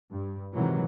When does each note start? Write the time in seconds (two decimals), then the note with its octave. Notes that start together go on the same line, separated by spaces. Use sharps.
0.11 G2
0.54 G#2 C3 D#3 E3 F#3